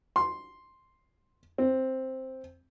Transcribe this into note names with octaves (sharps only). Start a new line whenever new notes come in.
C6
C4